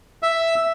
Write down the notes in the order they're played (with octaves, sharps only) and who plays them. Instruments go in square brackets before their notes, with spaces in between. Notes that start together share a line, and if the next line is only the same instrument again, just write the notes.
[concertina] E5